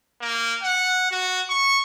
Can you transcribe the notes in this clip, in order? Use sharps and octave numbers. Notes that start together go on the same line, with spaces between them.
A#3
F#5
F#4
C#6